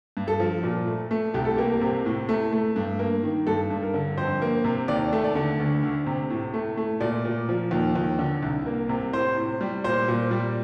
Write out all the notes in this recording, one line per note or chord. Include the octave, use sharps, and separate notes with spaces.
G2
A4
F3
A#2
A3
A3
C2 G4
A4
A#3 G4
C3
A2
A3
A3
G2
A#3
D#3
G2 A4
G2
A#4
D3
F2 C5
A#3
C3
D#2 D5
A3
D5
D3
D2
D2
C3
A2
A3
A3
A#2 D5
A#2
F3
D#2
D#2
D3
C2
A#3
C3
A2 C5
A2
G3
A#2 C5
A#2
G3